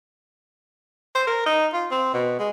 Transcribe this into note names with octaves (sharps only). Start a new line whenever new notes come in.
C5
A#4
D#4
F4
C4
B2
G#3